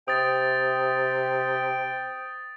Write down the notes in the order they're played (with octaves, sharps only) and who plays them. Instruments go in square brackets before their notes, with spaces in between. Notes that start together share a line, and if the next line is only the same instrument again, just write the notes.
[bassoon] C3 [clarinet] G5 [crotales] D#6 A6